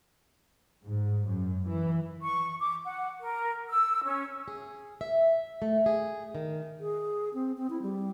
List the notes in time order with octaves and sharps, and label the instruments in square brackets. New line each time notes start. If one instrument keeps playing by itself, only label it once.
[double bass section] G#2
F#2
E3
[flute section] C#6
D6
F#5
A#4
E6
C#4
[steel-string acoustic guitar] G#4
E5
A3
G#4
D#3
[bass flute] G#4
C4
C4
E4
G3